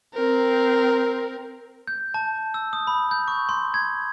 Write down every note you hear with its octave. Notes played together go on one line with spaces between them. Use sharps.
C4 A#4
G6
A5
E6
D#6
B5
G6
C#6
C6
G#6